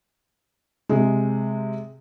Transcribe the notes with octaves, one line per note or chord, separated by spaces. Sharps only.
C3 G#3